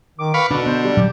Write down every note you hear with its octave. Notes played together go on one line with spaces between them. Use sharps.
D#3 D6
B4 F5 B5 C#6
B2 D3 D4 B4
B3 C5
G3
A#2 F#3 G4